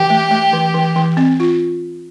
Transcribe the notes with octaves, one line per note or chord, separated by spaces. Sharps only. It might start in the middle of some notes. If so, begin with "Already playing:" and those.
Already playing: E3 G4
A3
A3
E3
E3
E3
C4
F4